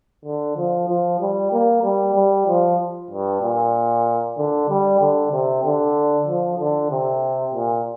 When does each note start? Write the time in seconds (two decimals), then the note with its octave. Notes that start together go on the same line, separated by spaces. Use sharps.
0.25 D3
0.57 F3
0.89 F3
1.21 G3
1.52 A#3
1.84 G3
2.15 G3
2.47 F3
3.11 G2
3.42 A#2
4.38 D3
4.69 G3
5.00 D3
5.32 C3
5.64 D3
6.27 F3
6.59 D3
6.91 C3
7.54 A#2